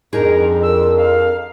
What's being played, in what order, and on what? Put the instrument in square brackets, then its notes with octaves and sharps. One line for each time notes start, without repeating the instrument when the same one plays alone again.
[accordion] F2 [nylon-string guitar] D4 D#4 G#4 [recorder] A#4
[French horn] A#4 [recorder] E6
[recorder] F5